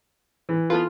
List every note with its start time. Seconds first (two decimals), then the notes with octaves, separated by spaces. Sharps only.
0.49 E3
0.70 B3 F4 A4 B4